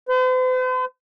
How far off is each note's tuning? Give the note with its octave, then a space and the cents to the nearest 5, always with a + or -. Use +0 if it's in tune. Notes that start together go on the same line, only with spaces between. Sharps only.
C5 -45